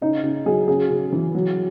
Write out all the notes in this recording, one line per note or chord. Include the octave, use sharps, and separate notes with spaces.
C#3 D#4
C#3
F#3 G#4
C#3 G#4
C#3
E3
F#3